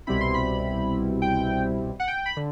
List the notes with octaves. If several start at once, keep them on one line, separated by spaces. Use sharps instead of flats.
C2 B2 G3 C4 E4 B5
C6
B5
G5
F#5
G5
B5
D3